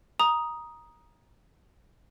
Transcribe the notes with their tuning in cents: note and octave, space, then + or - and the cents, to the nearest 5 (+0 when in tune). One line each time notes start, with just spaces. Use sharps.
A#5 +15 D#6 +0